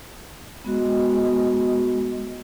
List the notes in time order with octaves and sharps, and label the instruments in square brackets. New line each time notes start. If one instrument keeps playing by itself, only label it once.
[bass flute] G#3 [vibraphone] B3 F#4